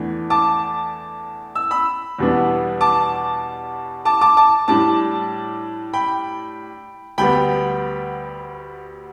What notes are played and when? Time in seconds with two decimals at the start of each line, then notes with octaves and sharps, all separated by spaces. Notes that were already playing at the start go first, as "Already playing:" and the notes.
Already playing: E2 E3 A3 D4
0.30 A5 D6
1.55 E6
1.71 B5 E6
2.19 E2 B2 G3 B3 D4
2.81 A5 D6
4.05 A5 D6
4.21 A5 D6
4.37 A5 D6
4.68 A2 G3 D4 A5 D6
5.93 G5 B5
7.18 D2 D3 G3 B3 G5 B5